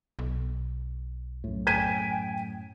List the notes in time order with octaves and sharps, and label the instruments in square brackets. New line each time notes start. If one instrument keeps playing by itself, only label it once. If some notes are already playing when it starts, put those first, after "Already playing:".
[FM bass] B1
[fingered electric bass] F#2 A2
[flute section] G5 G#5 [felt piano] G#6 B6 D#7